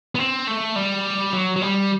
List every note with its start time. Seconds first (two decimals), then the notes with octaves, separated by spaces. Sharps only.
0.15 B3
0.19 C4
0.47 A3
0.76 G3
1.33 F#3
1.56 F#3
1.62 G3